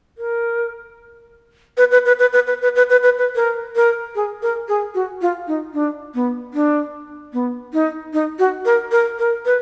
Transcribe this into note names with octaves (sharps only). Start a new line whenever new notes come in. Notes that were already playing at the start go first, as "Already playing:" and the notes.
A#4
B4
B4
B4
B4
B4
B4
B4
B4
B4
B4
B4
A#4
A#4
G#4
A#4
G#4
F#4
F4
D#4
D4
B3
D4
B3
D#4
D#4
F#4
A#4
A#4
A#4
B4